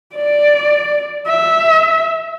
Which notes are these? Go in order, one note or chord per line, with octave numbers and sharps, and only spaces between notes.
D5
E5